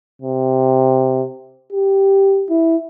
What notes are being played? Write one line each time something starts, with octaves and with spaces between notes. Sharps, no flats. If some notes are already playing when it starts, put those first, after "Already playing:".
C3
G4
E4